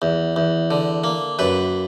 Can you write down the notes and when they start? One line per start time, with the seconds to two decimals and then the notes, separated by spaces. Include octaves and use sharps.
0.02 E2
0.36 E2
0.71 D3
1.04 A#3
1.39 F#2 B4